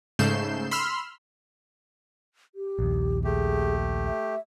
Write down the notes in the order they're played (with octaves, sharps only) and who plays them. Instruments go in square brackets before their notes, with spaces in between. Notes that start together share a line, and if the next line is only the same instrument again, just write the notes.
[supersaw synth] G#2 C#3 A3 G6 C7 E7
B5 C6 E6 F6
[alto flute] G4
[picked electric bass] A#1 D#2
[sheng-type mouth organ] A3 G4 [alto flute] G#4
[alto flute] E5